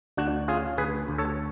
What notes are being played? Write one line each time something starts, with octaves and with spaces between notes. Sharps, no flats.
D2 D4 F#4
C#4 F4 G#4
D2 G#4 B4
D2
A4 C#5